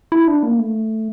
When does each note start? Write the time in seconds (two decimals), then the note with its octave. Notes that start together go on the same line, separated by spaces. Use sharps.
0.12 E4
0.28 D4
0.43 A#3
0.59 A3